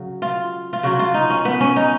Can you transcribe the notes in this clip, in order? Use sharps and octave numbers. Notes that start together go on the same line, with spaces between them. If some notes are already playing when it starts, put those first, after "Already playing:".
Already playing: C#3 F#3
F4
F4
C#3 F#3 F#4
F4
D#4
C#4
B3
C#4
D#4